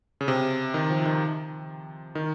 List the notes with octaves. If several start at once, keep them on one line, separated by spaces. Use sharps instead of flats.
C#3
C3
D#3
F3
D#3
D#3